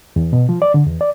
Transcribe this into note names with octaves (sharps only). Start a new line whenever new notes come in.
E2
B2
F3
D5
D3
E2
D5